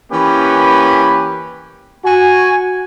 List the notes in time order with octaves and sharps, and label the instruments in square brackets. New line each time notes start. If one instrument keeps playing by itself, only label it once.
[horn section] E3 A#3 C#4 G4 B4
F#4 G#5